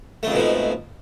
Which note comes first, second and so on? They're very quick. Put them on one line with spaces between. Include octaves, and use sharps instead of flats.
A3 F2 G#2 B2 F3